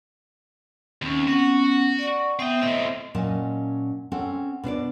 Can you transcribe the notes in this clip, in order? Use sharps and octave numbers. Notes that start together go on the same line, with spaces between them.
D#2 C4 C#4
B3 C#4 F#4 F#5
D5 F#5 C#6
B3 C4 E5 G5 D#6
A2 C4 D#5 E5
A#2 F#3 C#4 D#5 A5
C4 C#4 A4 F#5
B2 D4 C5 D5